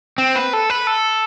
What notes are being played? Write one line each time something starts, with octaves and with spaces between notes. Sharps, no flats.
C4
B4
A4
B4
A4